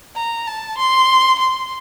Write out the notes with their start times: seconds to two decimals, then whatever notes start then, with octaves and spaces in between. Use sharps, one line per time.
0.16 A#5
0.47 A5
0.77 C6
1.39 C6